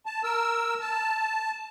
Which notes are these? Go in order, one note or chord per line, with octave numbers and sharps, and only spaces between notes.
A5
A#4 E6
A5